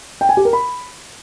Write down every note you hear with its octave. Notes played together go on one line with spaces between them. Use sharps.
G5
G#5
G4
A#4
B5